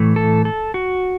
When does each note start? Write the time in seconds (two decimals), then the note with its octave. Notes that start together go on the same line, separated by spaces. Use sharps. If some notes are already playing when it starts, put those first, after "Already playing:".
Already playing: A2 E3 A3
0.16 A4
0.45 A4
0.74 F#4